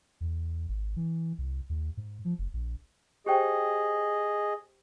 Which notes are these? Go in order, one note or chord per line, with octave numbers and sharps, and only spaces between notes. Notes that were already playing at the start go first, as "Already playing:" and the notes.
E2
G#1
E3
C2
D#2
G#2
F3
F#1
A#1
G4 G#4 C5 D#5 G5